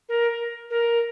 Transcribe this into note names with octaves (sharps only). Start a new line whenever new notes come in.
A#4
A#4